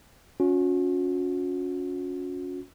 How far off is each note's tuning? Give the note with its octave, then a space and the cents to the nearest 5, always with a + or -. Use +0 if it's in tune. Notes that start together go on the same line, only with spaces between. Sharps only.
C#4 +15 F#4 -40